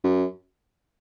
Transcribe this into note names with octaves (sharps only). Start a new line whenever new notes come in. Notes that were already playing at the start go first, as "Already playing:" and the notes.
F#2